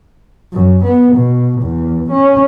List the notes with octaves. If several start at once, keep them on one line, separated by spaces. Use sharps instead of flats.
F#2
B3
B2
E2
C#4